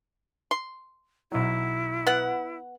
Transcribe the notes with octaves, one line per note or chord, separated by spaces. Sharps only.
C6
B1 F#3 E4
B3 F#5